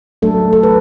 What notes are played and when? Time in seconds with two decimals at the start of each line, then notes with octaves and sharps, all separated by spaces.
0.22 F#3 A3 D4 A4
0.53 A4
0.63 B4